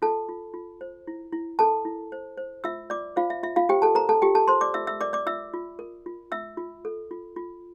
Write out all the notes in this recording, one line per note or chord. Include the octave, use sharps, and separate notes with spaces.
F4 A4 A5
F4
F4
C5
E4
E4
A4 A#4 A5
E4
C5
C5
F4 E5 E6
F4 D5 D6
F4 C5 F5
E5
F4 E5
F4 F5
G4 C5 G5
A4 A5
A#4 C5 A#5
A4 A5
F4 G4 G5
A4 A5
A#4 C5 C6
D5 D6
F4 E5 E6
E5 E6
A#4 D5 D6
D5 D6
F4 E5 E6
F4
A#4
F4
F4 E5 E6
F4
A4
F4
F4